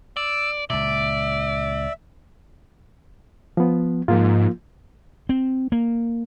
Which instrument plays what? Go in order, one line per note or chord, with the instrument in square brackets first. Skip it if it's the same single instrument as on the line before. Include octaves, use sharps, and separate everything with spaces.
[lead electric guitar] D5 [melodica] E6
[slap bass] C#2 A#2 [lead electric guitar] D5 [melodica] E5
[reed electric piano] F3 B3
[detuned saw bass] G#2 [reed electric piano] F3 A#3 F4
[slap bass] C4
A#3